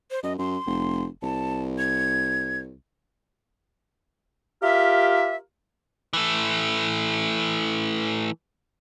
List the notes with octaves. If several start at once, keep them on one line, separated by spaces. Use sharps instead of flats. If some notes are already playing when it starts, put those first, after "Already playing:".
C5
F#2 D#5
F#2 C6
F1
C2 A5
G#6
F4 G4 A#4 E5
E3 A3